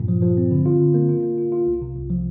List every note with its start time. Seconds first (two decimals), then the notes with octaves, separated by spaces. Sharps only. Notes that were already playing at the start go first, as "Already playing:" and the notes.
Already playing: G2 A#2
0.08 F3
0.22 F3
0.37 C4
0.51 D3
0.66 F4
0.80 D3
0.94 A#3
1.09 F4
1.23 A#3
1.38 F4
1.52 F4
1.67 C2
1.81 C3
1.96 C2
2.10 F3